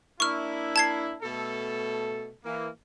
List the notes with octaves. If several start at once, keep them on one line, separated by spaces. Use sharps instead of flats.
A#3 D4 E4 C#6 F6
A5 G#6 C7
B2 A3 A4
E3 A#3